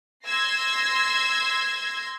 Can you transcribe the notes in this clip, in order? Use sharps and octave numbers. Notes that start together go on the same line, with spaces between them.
C6 E6 G#6 A#6 C7